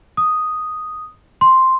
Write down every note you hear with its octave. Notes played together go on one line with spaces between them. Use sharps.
D#6
C6